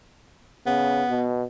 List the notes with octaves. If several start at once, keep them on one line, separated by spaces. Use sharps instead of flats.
C#3 B3
B2